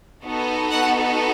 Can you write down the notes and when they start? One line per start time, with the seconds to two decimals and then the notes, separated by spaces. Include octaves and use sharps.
0.25 B3 D#4 F#4 A4
0.70 F#5